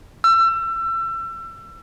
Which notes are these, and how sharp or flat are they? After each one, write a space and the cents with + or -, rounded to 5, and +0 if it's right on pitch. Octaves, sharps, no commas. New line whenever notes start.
E6 +30